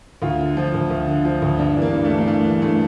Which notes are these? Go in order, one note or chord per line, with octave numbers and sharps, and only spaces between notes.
D2 F4
D3
F3
D2
D2
D3
F3
D2
G2 D4
E3
A#3
G2
A3
E3
A#3
G2 A3
E3
G2 A3